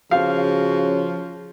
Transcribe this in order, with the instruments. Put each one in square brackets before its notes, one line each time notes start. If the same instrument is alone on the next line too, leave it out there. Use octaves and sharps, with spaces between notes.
[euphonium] C#3 [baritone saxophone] F3 [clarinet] F#4 [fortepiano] F5